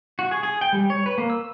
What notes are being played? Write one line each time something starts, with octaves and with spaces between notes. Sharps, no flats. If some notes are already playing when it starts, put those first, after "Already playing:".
F#4
G#4
G#4
G5
G3
C#5
B4
A#3
E6